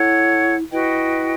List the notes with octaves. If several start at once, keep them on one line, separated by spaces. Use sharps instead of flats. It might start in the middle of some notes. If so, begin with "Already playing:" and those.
Already playing: E4 A4 C#5 F#5
E4 F#4 B4 D#5 G5